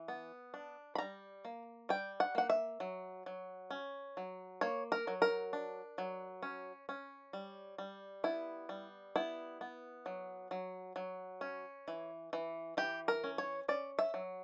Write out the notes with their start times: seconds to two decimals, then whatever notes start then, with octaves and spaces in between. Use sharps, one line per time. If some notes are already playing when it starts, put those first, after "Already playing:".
Already playing: E3
0.08 B3
0.54 D4
0.95 B5
0.98 G3 A#5
1.45 A#3
1.89 G3 G5
2.20 F#5
2.35 A#3 F#5
2.50 E5
2.80 F#3
3.26 F#3
3.71 C#4
4.17 F#3
4.61 A#3 C#5
4.92 A#4
5.07 F#3
5.22 A#4
5.53 D4
5.98 F#3
6.43 C#4
6.89 C#4
7.33 G3
7.78 G3
8.24 B3 E4
8.69 G3
9.16 B3 E4
9.61 B3
10.06 F#3
10.51 F#3
10.96 F#3
11.41 C#4
11.88 E3
12.33 E3
12.77 E3 G4
13.08 A#4
13.24 C#4
13.38 C#5
13.68 C#4 D5
13.99 E5
14.14 F#3